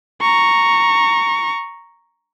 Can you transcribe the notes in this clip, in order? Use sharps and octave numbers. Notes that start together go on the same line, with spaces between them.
A#5 C#6